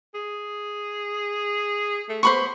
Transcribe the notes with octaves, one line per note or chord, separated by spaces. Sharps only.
G#4
A3
B3 C5 B5 C#6